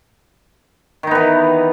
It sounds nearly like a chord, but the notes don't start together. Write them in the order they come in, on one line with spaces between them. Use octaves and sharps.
D#3 D#4 B3 E3